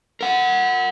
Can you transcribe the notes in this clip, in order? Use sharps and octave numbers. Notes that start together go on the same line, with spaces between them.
A#4 F#5